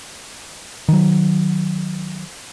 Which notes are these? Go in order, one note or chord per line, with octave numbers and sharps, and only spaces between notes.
D#3 F#3